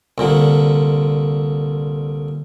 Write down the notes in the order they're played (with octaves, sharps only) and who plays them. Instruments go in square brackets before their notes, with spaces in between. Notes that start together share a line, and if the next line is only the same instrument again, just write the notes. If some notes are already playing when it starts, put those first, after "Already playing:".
[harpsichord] C2 A#2 D3